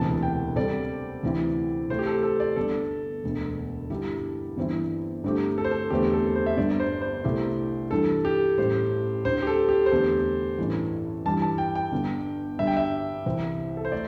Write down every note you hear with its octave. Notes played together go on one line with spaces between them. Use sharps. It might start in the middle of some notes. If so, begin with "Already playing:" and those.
Already playing: E1 D2 C3 E3 A5
G5
C3 G3 C4 A4 D5
D2 C3 E3 C4 E4
C3 A3 C4 C5
G4
A4
A4
D5
G1 G2 D3 A4
E1 D2 D3
G2 D3 G3 E4 G4
G1 G2 E3 C4 E4
G2 D3 A3 C4 G4
A4
C5
A4
E2 D3 A3 C4 G4
A4
A4
C5
E5
G1 G2 D3 G3 D4 D5
C5
C5
C2 C3 A3 E4 G4
G2 E3 G3 D4 A4
G4
A1 A2 G3 E4 C5
D2 D3 C4 C5
G4
A4
G4
C5
E2 D3 A3 C4 G4 A4
A1 G2 E3
G2 E3 G3 A5
A5
G5
G5
G1 G2 D3
G2 D3 G3 E5
G5
E5
C2 C3 E3 C4
A4
C5
A3 D5